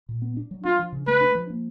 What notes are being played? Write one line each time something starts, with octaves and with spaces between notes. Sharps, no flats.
A#2
B3
D4
F#3
D4 F4
F3
C#3
A3 B4
D4
F3
A#3